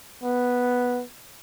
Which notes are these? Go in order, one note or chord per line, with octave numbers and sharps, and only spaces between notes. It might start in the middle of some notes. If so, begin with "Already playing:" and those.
B3